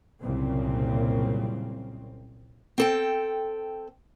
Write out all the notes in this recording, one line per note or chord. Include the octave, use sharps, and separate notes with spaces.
C2 F#2 A#2 C#3 C4
C4 A4 G5